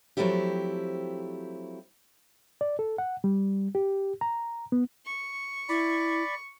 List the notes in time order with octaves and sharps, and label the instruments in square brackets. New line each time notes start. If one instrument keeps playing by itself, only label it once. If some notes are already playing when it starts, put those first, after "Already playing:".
[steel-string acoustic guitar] F3 F#3 A3 C4 E4 G4
[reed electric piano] D5
A4
F#5
G3
G4
A#5
B3
[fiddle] C#6
[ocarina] E4 [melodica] D5 B5